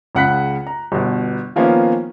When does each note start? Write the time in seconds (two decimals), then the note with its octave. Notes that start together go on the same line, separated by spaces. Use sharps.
0.15 C#2 C#3 F#5 B5 F#6 B6
0.67 A#5
0.92 G1 B2
1.56 D#3 F3 A#3 B3 C#4 F4